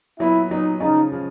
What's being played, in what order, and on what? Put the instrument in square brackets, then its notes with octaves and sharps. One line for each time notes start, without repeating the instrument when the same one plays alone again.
[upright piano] A#2 F#3 B3 [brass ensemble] E4
[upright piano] A#2 F#3 B3 [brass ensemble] D#4
[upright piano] C#3 F3 G#3 C#4 F4 [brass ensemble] D#4
[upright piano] C#3 F3 G#3